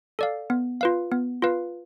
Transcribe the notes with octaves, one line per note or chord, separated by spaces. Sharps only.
A4 D5 F5
B3
F4 B4 F5
B3
F4 B4 F5